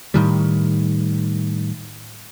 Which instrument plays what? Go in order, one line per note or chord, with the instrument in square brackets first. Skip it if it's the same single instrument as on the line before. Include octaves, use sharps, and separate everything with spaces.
[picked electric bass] A2 D#3 G3